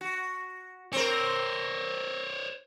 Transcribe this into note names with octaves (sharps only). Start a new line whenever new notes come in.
F#4
C4 A#4 C5 C#5